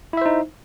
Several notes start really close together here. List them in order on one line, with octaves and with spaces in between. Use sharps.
E4 E5 C5 D#4